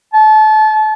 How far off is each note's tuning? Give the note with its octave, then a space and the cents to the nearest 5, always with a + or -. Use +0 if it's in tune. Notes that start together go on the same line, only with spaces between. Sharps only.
A5 -30